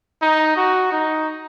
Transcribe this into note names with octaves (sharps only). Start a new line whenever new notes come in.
D#4
F#4
D#4